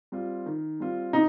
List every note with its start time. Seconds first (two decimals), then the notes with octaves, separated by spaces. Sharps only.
0.12 G3 C4 F4
0.46 D#3
0.80 G3 C4 F4
1.13 C3 D#4